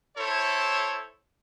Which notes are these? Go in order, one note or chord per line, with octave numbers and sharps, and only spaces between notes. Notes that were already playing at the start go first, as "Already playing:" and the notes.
E4 A4 C5 C#5